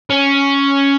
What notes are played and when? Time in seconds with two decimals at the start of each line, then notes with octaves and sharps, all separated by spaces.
0.10 C#4